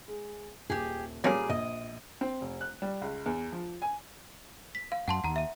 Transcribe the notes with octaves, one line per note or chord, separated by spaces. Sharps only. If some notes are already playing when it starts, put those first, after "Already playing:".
G#3
D#1 G4 G#4
A#2 F#3 G3 A#3 C#4 G#4 A#4 D7
A#1 D#5
C4
F1
F#6
G3
C#2
E2
F3
G#5
B6
F5
F#2 F#5 A5 C6
D#2 F#5 A#5
E5 D#7